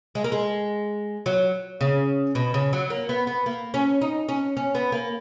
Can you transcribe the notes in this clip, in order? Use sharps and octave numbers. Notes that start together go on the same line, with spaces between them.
G#3
A#3
G#3
F#3
C#3
B2
C#3
F#3
A#3
B3
B3
A#3
C#4
D#4
C#4
C#4
B3
A#3